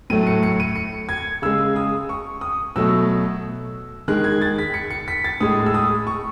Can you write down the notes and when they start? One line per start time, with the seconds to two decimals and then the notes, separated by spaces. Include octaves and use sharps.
0.10 A2 F#3 A3 D#7
0.27 C#7
0.43 C#7
0.60 D#7
0.75 C#7
1.09 G#6
1.42 C#3 G#3 E6
1.76 D#6
2.09 C#6
2.41 D#6
2.76 B2 F#3 A3 E6
4.08 D#3 G#3 F#6
4.24 G#6
4.41 A6
4.58 B6
4.74 C#7
4.90 C#7
5.08 B6
5.24 A6
5.40 A2 G#3 D#6
5.66 E6
5.74 D#6
6.07 C#6